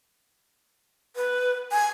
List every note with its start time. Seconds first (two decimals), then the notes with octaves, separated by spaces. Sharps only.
1.16 B4
1.72 G#5